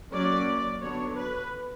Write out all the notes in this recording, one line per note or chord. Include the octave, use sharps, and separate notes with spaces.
F#3 A#3 C#4 D5
D3 F#3 B3 D4 C#5
B4